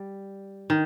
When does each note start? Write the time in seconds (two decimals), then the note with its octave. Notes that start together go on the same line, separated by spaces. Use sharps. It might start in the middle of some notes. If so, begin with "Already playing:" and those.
Already playing: G3
0.70 D#3